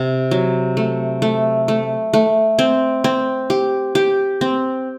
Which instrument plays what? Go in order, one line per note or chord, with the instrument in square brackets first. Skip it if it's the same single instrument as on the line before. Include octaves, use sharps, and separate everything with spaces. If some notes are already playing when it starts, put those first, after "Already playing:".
Already playing: [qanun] C3
F#3
A3
A3
A3
A3
C4
C4
G4
G4
C4